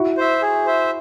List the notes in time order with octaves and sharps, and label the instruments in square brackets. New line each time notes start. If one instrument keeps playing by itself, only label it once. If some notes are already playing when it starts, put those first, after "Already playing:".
Already playing: [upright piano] E4 F#4
[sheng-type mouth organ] C5 E5
G#4
C5 E5